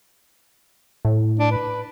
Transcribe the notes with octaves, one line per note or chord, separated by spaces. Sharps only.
A2
D4
B4